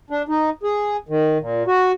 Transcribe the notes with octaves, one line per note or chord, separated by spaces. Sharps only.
D4
D#4
G#4
D#3
A#2
F#4